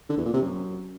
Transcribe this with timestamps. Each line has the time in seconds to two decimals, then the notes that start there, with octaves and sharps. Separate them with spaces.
0.09 D3
0.18 E2
0.26 A#2
0.34 C3
0.42 F#2